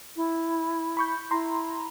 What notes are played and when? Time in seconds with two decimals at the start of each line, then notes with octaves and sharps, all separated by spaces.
0.16 E4
0.97 B5 C#6 G6
1.31 E4 A#5 C6